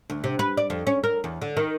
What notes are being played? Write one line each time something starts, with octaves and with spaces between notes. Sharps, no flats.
D2
C3
B4
D5
F2
C#4
A#4
E2
D3
D#3